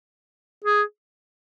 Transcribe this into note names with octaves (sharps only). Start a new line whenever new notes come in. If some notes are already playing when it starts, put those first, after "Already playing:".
G#4